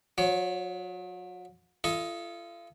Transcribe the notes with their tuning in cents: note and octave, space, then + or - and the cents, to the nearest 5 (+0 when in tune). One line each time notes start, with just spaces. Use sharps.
F#3 -40 C#5 +30
F4 -35 A4 +0 D#5 +10